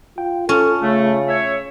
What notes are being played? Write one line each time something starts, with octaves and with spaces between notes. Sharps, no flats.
F4 G5
C#4 F4 A4 A5
C#3 A3
C#5 E5